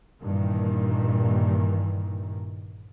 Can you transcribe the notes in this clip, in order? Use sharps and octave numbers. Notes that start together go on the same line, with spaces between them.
G2 A#2 D#3 E3